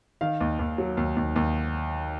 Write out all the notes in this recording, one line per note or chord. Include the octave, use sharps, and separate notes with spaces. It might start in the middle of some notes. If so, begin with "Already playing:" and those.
D#3 F5
D#2
D#2
F#3
D#2
D#2
D#2